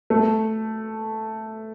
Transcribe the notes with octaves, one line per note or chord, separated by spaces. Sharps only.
A3